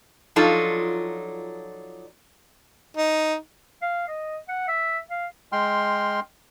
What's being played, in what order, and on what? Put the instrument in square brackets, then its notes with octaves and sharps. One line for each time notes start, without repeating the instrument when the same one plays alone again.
[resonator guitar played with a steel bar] F3 F#3 D4 D#4 F4 A4
[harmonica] D#4
[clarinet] F5
D#5
F#5
E5
F5
[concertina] G#3 G5 C6 F6